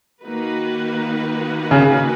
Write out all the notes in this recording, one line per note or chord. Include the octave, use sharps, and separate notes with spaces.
D#3 A#3 D#4 F#4 B4
C#3